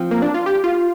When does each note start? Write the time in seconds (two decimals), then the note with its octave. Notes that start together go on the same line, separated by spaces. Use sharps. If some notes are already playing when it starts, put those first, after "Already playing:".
Already playing: F3 C4
0.11 A#3
0.22 D4
0.34 F4
0.46 G4
0.64 F4